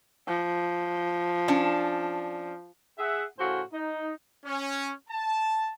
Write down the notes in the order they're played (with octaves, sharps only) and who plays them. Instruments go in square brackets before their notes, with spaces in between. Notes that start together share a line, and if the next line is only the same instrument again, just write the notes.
[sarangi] F3
[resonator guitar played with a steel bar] C#4 D4 A5
[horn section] G#4 E5 F#5
A2 C#3 F#4 C5 F5 G#5
D#4
[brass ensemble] C#4
A5